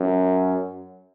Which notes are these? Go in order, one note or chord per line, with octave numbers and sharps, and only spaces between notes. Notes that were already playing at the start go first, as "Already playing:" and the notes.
Already playing: F#2